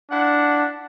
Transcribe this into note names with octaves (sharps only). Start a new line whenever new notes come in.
D4 E4 F5 F#5